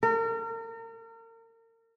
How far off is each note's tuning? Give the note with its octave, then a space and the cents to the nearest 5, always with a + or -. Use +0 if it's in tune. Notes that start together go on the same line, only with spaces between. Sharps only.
A#4 -35